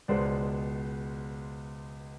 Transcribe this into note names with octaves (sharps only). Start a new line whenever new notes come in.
C#2 B2 G#3 B3 C5 D5